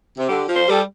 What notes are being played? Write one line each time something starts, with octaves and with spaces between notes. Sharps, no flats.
C3
D3 G4
F3
C5
G3 A4